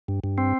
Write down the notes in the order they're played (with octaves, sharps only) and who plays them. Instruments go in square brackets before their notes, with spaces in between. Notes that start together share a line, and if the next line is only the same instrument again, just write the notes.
[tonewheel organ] G2
G2
C4